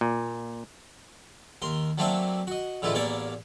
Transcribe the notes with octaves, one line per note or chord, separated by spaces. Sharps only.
A#2
D#2 A#4 C6
F#3 A3 A#3 C4 D4 E5
F#4 D#5
A2 D3 E3 G#3 E4 F4
A1 E2 A#3 A#4 C#5 D5